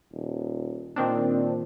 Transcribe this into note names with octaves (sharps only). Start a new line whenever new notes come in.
D#1
A#2 D#3 C4 D4